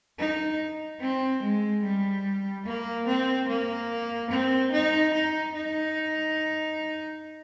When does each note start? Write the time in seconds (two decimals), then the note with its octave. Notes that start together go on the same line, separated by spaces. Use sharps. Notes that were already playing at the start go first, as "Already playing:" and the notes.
0.19 D#4
1.01 C4
1.42 G#3
1.83 G3
2.66 A#3
3.07 C4
3.48 A#3
4.30 C4
4.72 D#4
5.13 D#4
5.55 D#4